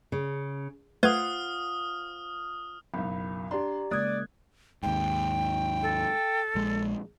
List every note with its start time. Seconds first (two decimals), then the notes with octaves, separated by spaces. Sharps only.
0.12 C#3
1.03 A3 F4 B4 C5 F#5 D#6 F6 G#6
2.94 F#1 B1 B5
3.51 D4 G4 D5 A#5 C6
3.91 C#3 G#3 A#3 D5 D#6 F#6 G#6
4.83 D#2 G#2 G5
5.82 A4
6.55 A#1 G#3